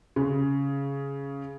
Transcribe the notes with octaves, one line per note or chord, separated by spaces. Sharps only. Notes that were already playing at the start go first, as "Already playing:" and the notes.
C#3